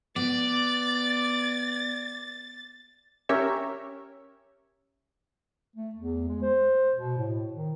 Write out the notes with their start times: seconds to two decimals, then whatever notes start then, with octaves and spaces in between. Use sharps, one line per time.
0.16 B3 D5 A6
3.29 C#4 G4 A#4 C#5 E5
5.76 A3
5.95 E2
6.28 G#3
6.42 C5
6.95 B2
7.18 A2
7.53 D#3